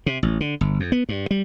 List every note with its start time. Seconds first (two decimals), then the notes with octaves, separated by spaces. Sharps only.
0.06 C3
0.23 A1
0.41 D3
0.61 G1
0.80 F2
0.92 B3
1.09 G2
1.31 G3